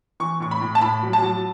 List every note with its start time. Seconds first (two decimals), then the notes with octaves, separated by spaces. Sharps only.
0.20 E3 C#6
0.40 A2 C#6
0.51 B5
0.61 A2
0.75 A5
0.81 A2 B5
1.03 F#3
1.13 A5
1.22 F#3